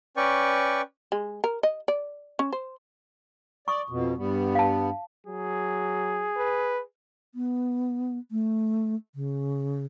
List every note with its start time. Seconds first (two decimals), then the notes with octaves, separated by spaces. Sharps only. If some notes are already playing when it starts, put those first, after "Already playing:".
0.17 C#4 B4 D5 G5 C#6
1.12 G#3
1.44 A#4
1.63 D#5
1.88 D5
2.39 C#4
2.52 C5
3.68 D5 C#6 D#6
3.90 F2 B2
4.17 G2 G3 B3
4.55 F5 A5
5.27 F#3 G#4
6.37 B4
7.35 B3
8.31 A3
9.15 C#3